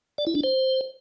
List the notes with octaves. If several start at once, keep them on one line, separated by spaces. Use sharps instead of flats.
D5
E4
D4
C5